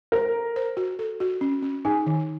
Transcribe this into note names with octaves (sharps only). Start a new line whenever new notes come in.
A#4 C5 A#5
A4
C5
F#4
A4
F#4
C#4
C#4
D#4 G#4 G#5
D#3